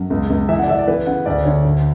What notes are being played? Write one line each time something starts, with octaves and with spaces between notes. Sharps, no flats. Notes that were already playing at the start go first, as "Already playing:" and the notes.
Already playing: F#2
C#2
C#2
E3 E5
F#5
D5
E3 E5
D5
E3 B4
C#3 F#5
D2 D5
D3 C#5
D2